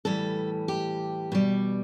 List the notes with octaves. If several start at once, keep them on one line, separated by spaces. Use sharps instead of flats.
A2 E3 G3 A4
G4
B2 G3